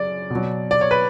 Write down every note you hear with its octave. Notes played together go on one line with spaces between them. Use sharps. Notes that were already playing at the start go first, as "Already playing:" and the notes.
Already playing: F#2 C#3 D5
B2
F#3
D5
C#5
B4